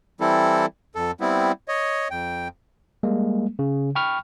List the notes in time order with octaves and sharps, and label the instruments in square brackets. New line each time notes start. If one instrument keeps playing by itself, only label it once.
[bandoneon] E3 G3 C4 E4 A4
F2 A4
G3 B3 C4 E4
C#5 D#5
F2 G5
[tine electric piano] G3 G#3 A#3
C#3
G5 B5 C#6 F6